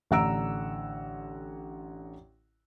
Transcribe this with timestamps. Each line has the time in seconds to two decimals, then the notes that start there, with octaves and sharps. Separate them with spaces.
0.11 A1 D3 F#5 A#5 E6 D7